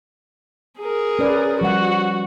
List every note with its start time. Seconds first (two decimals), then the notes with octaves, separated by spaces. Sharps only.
0.80 G#4 A#4
1.19 C#4 B4 D5
1.61 F3 G3 F#4 F#5